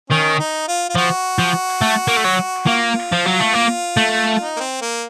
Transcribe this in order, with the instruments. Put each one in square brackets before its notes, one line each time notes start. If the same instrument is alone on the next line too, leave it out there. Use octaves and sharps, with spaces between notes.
[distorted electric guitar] D#3 [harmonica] C#4
[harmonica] D#4
F4
F4
[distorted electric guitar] F3 [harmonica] F#4
[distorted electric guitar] F3
A3
A#3
A3
F#3
[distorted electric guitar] A#3 [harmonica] F4
[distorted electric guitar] F3
F#3
A3
A#3
A3
[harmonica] D#4
A#3
C4
A#3